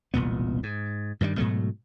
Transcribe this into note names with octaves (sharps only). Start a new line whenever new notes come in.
E1 C2 A#2 B3
G#2
G2 D#3 E3 G3
G#2 B2 F#3 A3